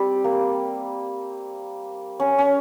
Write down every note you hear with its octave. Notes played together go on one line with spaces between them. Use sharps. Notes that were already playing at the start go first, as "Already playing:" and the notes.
Already playing: G3 C4
A#3
C#4
C#4